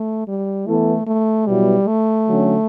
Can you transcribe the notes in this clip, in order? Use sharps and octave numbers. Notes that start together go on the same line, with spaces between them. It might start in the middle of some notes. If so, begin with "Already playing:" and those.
Already playing: A3
G3
E3 A3 B3 E4 A4
A3
B2 F#3 G3 B3 E4
A3
D3 F#3 C#4